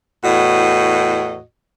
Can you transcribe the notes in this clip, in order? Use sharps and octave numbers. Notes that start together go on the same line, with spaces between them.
E2 A2 F#4 D#5